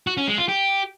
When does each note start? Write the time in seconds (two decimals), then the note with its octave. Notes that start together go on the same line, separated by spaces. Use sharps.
0.07 F#4
0.17 C#4
0.28 G#3
0.38 F4
0.48 G4